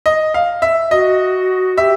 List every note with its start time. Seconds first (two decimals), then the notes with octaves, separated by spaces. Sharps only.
0.06 D#5
0.34 F5
0.62 E5
0.91 F#4 D#5
1.77 G4 E5